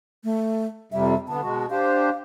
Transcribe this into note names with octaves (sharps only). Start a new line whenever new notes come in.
A3
F2 C3 G3 E5
D3 B3 A5
B2 G#3 F#4
D4 G4 C5 F5